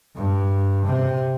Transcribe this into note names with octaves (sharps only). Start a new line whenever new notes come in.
G2
C3